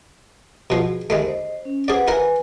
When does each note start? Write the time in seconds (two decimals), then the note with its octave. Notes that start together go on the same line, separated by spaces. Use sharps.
0.70 B2 F3 G#4
1.10 D#2 G#3 A3
1.26 C5 D#5
1.65 C#4
1.88 G#4 B4 C5 D5 F#5
2.08 E4 A#4 B4 F#5 G#5